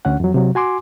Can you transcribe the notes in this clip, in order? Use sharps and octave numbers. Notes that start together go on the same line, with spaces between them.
D2 C#4 F#5
F2 F#3
C3 F#3
F#4 G#5 C6 D6